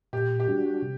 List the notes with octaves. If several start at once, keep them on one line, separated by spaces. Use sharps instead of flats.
A#2 G4
G4
G3 D4 F#4
C3